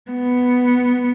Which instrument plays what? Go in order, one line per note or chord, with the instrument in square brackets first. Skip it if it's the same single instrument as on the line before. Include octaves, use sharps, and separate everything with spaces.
[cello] B3